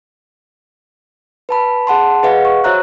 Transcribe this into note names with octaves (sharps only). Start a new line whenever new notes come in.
B4 A5 B5
G#4 F#5 A5 C6
G#4 B4 D#5 F5 F#5
C#6
F#4 C5 C#5 E5 A#5 F#6